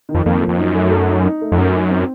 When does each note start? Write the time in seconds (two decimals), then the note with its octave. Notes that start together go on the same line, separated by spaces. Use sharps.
0.09 D#3
0.15 F2
0.26 F2 A#3
0.42 F3
0.48 F2
0.58 F#2 D#4
0.75 A3
0.91 A4
1.08 D#4
1.25 D#4
1.42 A3
1.52 F2
1.58 F#2 A#4
1.74 D#4
1.91 C4